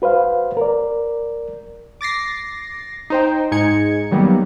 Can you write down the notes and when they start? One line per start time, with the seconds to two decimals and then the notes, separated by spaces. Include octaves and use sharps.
0.02 F#4 B4 C5 F5
0.57 A#4 D5
2.01 D6 A6 A#6 C7
3.10 D#4 C5 G5
3.52 G#2 D#4 G#4 G#6 C#7
4.11 D#3 F#3 G3 A#3 B3